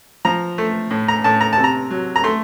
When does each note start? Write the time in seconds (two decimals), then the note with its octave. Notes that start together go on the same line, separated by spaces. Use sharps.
0.25 F3 A#5
0.58 A3
0.91 A2
1.08 A#5
1.24 A2 A5
1.41 A#5
1.53 A5
1.58 C3
1.64 A#5
1.90 F#3
2.16 A#5
2.24 A3 C6